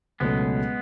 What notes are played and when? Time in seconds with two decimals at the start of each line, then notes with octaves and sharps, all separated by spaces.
0.20 C#2 B2 F#3 G#3 A3 B3 C#4